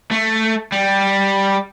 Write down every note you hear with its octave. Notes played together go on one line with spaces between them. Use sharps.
A3
G3